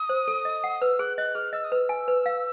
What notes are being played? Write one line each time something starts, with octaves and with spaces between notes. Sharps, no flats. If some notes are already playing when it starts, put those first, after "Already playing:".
Already playing: D#6
C5
A4
D#5
F#5
B4 E6
G#4 F#6
D#5 F#6
G#4 F6
D#5 E6
D#6
B4 E6
G#5
B4
F5